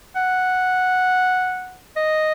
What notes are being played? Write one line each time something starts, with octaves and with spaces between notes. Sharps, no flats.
F#5
D#5